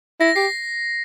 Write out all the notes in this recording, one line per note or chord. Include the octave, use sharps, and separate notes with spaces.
E4 A#6
G4 C7